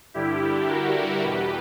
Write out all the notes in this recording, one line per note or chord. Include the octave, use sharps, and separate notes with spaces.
G2 D3 G3 E4 G4
F#4 A#4
E2 B2 G3 G4 B4